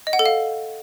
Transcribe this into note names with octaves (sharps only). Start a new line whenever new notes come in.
D#5
F#5
A4
F5